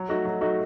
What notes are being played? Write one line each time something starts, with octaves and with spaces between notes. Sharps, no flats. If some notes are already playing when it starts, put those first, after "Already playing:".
Already playing: F#3
A3 D#4 F#4
F#3
A3 D#4 F#4